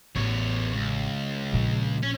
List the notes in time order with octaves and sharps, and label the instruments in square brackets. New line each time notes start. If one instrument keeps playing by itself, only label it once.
[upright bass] A1 [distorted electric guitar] E2 C#5
[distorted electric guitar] C#2
[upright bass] A#1 A#2
[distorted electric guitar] C#4